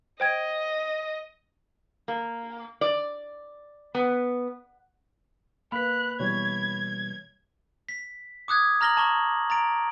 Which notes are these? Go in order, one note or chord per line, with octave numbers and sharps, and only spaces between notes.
C5 D#5 G5 G#6
A#3
D5
B3
A#3 B4 B5 F#6 B6
B2 E3 G3 C#5 G#6
B6
D6 D#6 F#6 G#6
A#5 F6 A#6 F#7 G7
A5 A#5 C#6 F6 G7
A#5 A6 D7